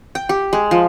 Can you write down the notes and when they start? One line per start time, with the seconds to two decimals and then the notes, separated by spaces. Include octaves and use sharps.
0.15 G5
0.29 G4
0.53 G#3
0.71 F3